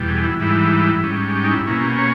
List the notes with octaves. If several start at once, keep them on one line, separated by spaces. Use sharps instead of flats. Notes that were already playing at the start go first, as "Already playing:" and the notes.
Already playing: E2 B2 G3
G#4
E4
G#2 E3 G3 E4
G#2 G3 C#4
G4
D#4
E4
B2 A#3 C#4 E4
G4
C#5